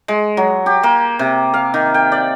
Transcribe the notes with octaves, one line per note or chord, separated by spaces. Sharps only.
G#3
F#3
G4
A#3
C3
F5
D#3
G5
D5